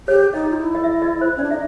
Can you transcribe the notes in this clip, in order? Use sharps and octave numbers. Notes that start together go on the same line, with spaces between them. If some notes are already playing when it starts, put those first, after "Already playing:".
G4 C#5
D#4 D#5
F4
E4
D#5
E5
D#5
C5
C#4
D4 D5
D#4 E5